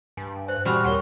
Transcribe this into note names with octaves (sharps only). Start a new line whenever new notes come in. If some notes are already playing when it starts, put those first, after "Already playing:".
G2 G#5
C5 G#5 F#6
A#2 G3 C4 F#4 F6
D#2 A#4 C#5 F#5 C6